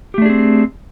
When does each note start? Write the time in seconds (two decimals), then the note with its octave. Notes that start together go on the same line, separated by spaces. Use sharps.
0.14 G4
0.18 A3
0.22 D4
0.26 G#4
0.30 C4